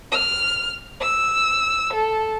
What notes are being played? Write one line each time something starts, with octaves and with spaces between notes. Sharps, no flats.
F6
E6
A4